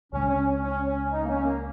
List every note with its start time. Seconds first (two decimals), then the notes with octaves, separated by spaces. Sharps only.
0.12 C#2 C#3 G#3 C#4
0.29 C#4
0.46 C#4
0.63 C#4
0.87 C#4
1.12 D#4
1.24 A#3
1.29 C#4
1.45 A#3